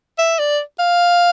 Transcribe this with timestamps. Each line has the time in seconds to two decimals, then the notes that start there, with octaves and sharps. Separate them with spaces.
0.18 E5
0.39 D5
0.79 F5